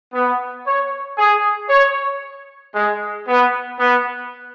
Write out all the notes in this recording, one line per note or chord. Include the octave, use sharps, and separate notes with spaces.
B3
C#5
G#4
C#5
G#3
B3
B3